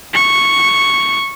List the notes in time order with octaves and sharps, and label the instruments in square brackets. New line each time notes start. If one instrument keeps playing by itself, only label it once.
[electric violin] C#6